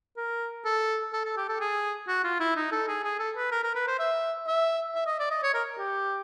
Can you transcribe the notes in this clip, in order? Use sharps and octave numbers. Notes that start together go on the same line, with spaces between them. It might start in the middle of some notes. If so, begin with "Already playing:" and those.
A#4
A4
A4
A4
G4
A4
G#4
F#4
F4
E4
D#4
A4
G#4
G#4
A4
B4
A#4
A#4
B4
C5
E5
E5
E5
D#5
D5
D#5
C#5
A#4
G4